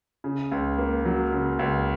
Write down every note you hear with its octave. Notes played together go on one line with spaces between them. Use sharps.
C#3
C#2
A#3
F#3
C#3
C#2